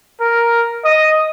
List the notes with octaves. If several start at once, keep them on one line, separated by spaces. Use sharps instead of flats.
A#4
D#5